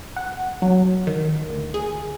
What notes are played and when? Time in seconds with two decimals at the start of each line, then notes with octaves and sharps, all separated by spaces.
0.16 F#5
0.62 F#3
1.07 D#3
1.49 D2
1.74 G#4